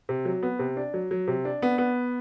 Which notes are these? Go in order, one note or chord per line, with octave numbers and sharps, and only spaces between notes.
C3
F#3
B3
C3
D4
F#3
F#3
C3
D4
B3
B3